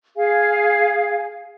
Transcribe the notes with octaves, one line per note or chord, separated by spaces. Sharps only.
G#4 F5 G#5